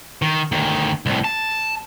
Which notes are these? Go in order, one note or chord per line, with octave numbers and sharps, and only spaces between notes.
D#3
D2 D#3
C2 A2
A5